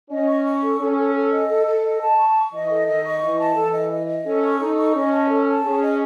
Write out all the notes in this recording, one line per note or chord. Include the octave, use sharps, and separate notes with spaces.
C#4 D#5
C#6
C#6
A4
C#4 A4
A4
A4
D#5
A4
A4
D#5
A5
C#6
C#6
E3 D#5
A4
D#3 D#5
C#6
E3 D#5
A5
E3 A4
D#5
D#5
D#5
C#4 A4
C#6
D#4 A4
C#6
C#4 D#5
A5
A4
A5
C#4 G#4
D#5